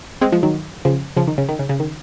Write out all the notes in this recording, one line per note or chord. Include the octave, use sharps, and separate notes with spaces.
G#3 C4
F3 G#3
D#3 F#3
C#3 F3
C#3 F3
D#3
C#3
D#3
C#3
C#3
D#3